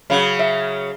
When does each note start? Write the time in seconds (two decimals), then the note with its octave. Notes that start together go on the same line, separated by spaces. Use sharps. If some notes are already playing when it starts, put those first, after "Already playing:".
0.10 C#3 F#3 F5
0.39 E5